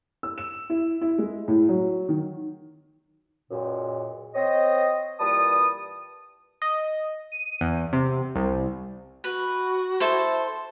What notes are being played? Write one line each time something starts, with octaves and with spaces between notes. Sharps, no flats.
E6
E7
E4
E4
G#3
A2
F#3
D#3
C#2 F#2 A#2
C4 C#5 D#5
A#2 E3 G3 B4 A5 D#6
D#5
D#7
E2
C3
C2
F#4 B4
E4 A4 C5
C6